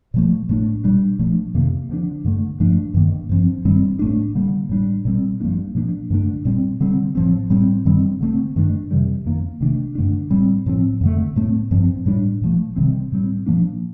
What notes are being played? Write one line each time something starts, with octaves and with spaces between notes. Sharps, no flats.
A#2 F3 A3
A2 A3 D4
A#2 G3 D4
A#2 F3 A3 D4
F2 C3 D#3 A#3
D3 F3 A#3 D4
G2 D3 A3
G2 F3 A3 D4
G2 D#3 A#3
G2 F3 C4
G2 D#3 G3 C4
A2 A3 D4
D3 G3 A#3
A2 G3 D4
A#2 G3 C4
G2 F3 A#3 D4
A#2 F3 A#3 D4
G2 D3 A3 D4
A#2 G3 C4
D3 G3 C4
A2 F3 C4
A2 G3 C4
G2 D#3 G3 C4
D3 A3 C4
G2 D#3 A3 D4
F2 C3 D#3 G3
F2 D#3 A#3
C3 D#3 A3 D4
G2 D3 A3 D4
A2 G3 C4
A2 F3 C4
F2 D3 A3
A2 A3 C4
G2 F3 C4
A2 G3 D4
A#2 F3 A3
C3 D#3 G3 C4
A2 G3 C4
A#2 F3 A#3 D4